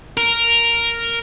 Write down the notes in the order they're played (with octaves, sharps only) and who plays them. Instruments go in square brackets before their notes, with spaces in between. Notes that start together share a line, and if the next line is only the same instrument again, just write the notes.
[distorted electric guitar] A#4